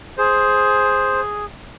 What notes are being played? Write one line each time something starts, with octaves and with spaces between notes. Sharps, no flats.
G#4 C5